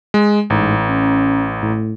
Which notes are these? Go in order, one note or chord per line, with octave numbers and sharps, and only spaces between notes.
G#3
A1 G#2
C#4
A2